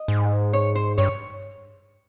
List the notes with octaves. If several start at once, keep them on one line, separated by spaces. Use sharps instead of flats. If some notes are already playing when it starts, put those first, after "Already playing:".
Already playing: D#5
G#2
C#5
C5
G2 C#5